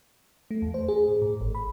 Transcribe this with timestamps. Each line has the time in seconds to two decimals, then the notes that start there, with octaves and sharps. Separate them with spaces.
0.51 A3
0.62 E2
0.74 C5
0.88 G#4
1.09 A2
1.22 A2
1.41 G#1
1.55 B5